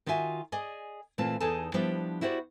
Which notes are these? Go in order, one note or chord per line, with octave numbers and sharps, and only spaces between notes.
D#3 F4 F#4 E5 G#5
G#4 D5 D#5 G#5
A#2 E3 A3 C4 F4 A5
E2 D#4 G#4 A4 G#5 A5
F3 G3 B3 D4 E4 G4
E4 F#4 G4 C5 D5